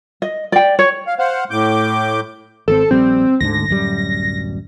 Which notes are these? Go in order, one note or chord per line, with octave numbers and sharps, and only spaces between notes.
D#5
D5 G5
C#5
F5
C5 F5 F#5
A2 D6 G6
G#1 F3 C4 A4
A#1 G3 C4
D2 G#2 D3 A#6
D1 F#2 G3